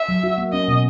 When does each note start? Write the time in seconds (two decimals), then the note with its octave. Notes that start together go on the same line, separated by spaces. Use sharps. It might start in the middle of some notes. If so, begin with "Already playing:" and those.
Already playing: E5
0.09 F#3
0.24 F#4
0.38 A#3
0.53 C#4 D#5
0.68 B2